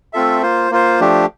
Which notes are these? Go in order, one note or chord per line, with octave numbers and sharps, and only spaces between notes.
A3 C4 F4 A4 E5
A#3 F4 C5
A#3 F4 C5
F3 A3 D4 G4